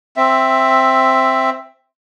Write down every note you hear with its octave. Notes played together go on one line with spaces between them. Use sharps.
C4 E5